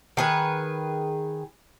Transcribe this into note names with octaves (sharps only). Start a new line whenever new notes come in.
D#3 G#4 B4